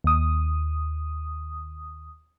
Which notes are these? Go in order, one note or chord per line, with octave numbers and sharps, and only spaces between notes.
D#2 D#6